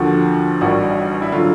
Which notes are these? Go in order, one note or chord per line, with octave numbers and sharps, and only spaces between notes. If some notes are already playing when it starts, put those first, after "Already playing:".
Already playing: D#2 D3 F3 F#4
A1 G2 D#3 G3 F#4
E4
D3 F#3 F4